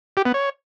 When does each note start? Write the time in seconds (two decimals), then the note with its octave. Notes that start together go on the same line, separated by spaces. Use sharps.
0.17 G4
0.25 B3
0.34 C#5